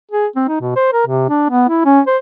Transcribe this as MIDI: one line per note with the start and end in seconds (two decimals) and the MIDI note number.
0.11 0.27 68
0.36 0.45 60
0.48 0.61 63
0.61 0.72 47
0.76 0.92 72
0.93 1.03 70
1.07 1.27 48
1.29 1.47 62
1.50 1.67 59
1.69 1.84 64
1.85 2.00 61
2.07 2.17 72